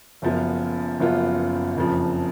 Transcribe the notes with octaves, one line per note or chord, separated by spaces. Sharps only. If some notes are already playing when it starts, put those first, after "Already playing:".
F#1 F#2 F3 B3 F4
F#1 F#2 F3 B3 F4
F#1 F2 F3